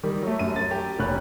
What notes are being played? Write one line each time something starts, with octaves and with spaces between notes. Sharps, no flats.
D#3 G3
F#3 A3
F#2 D#7
F#3 A6
G4
F1 C#4 F#6